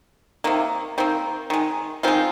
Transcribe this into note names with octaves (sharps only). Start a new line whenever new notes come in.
C3 D#3 A#3
D#3 A#3 C4
D#3 G#3
D#3 G#3 C4 F4